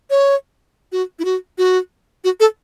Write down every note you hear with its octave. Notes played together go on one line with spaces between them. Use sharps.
C#5
F#4
E4
F#4
F#4
F#4
A4